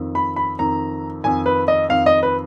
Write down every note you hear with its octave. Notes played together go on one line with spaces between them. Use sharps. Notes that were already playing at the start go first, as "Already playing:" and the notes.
Already playing: F2 D#3
B5
B5
F2 D#3 A#5
F2 D#3 G#5
B4
D#5
F2 D#3 F5
D#5
B4